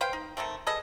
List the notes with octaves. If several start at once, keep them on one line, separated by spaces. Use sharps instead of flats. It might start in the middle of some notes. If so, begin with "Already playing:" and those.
B4 C5 F5 G5
D#4
D#3 G3 A3 C4
G#4 A4 B4 D#5